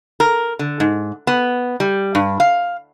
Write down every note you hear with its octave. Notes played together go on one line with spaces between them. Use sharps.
A#4
D3
G#2
B3
G3
G2
F5